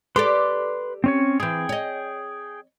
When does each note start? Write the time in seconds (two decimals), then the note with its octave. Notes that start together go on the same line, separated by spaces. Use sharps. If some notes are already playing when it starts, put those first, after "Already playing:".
0.16 G4 A4 B4 D5 C6
1.04 C4 C#4 C#5
1.40 E3 C4 G#4 G5
1.69 C#5 D#5